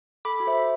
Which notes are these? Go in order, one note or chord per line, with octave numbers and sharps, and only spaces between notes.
A4 B5 D6
F#4
C5 E5
F#4